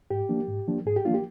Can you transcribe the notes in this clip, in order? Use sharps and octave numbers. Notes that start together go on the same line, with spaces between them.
G#2 G4
F3 A#3 D4
G#2
F3 A#3 D4
G#2 G#4
G4
F3 A#3 D4 F4
G4